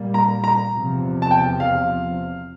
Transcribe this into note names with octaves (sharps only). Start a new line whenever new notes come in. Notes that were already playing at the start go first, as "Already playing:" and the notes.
Already playing: A#2 G3 A#3
A#5
A#5
E2 C3 F3
A5
G5
F5